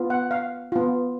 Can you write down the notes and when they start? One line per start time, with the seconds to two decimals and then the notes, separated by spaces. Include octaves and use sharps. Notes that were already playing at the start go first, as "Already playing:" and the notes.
Already playing: B3 F4
0.10 F#5
0.31 F5
0.72 B3 F4